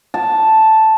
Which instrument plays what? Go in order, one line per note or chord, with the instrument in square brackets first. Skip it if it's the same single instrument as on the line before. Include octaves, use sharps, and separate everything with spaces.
[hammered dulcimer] A5